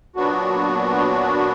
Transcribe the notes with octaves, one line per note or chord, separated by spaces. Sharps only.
A#2 F#3 B3 D4 F#4